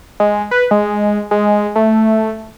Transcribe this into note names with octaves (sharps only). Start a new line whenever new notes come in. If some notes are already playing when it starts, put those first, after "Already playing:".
G#3
B4
G#3
G#3
A3